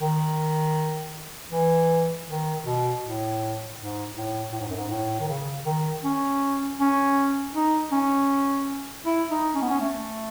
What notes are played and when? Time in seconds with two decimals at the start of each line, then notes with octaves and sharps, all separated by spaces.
0.01 D#3
1.52 E3
2.27 D#3
2.65 B2
3.02 A2
3.78 G#2
4.16 A2
4.53 A2
4.60 G#2
4.69 F#2
4.76 G#2
4.90 A2
5.20 D#3
5.28 C#3
5.66 D#3
6.04 C#4
6.80 C#4
7.54 D#4
7.91 C#4
9.06 E4
9.31 D#4
9.55 C#4
9.62 B3
9.70 C#4
9.80 A3